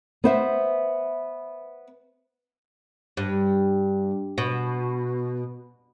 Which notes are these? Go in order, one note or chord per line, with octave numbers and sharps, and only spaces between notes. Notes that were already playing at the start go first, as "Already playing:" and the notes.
B3 C5 E5
G2
B2